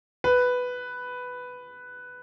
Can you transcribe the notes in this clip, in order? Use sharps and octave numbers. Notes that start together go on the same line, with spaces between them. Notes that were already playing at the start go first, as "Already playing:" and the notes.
B4